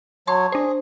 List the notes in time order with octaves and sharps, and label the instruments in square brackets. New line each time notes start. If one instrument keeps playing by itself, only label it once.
[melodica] F#3 C#5 [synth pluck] A5 C6 C#6
[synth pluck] D4 C5 [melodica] G#4